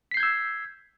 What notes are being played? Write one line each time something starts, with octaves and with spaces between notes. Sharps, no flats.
E6 G6 G#6 B6 C7